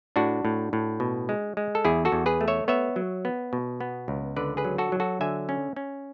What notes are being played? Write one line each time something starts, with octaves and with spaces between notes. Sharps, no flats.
A2 D4 F#4
A2
A2
B2
G#3
G#3
A4
E2 E4 G#4
F#4 A4
E2
G#4 B4
A3
C#5 E5
B3 C#5 E5
F#3
B3
B2
B3
C#2
D3 B4 D5
G#4 B4
F#3
F#4 A4
F#3
F#4 A4
D3 E5 G#5
C#4
C#4